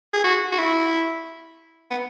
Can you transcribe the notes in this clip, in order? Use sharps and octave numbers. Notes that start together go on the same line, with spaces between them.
G#4
F#4
F#4
E4
B3